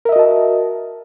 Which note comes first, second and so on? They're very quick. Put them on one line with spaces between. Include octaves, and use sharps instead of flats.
A#4 E5 D#5 F#4 A5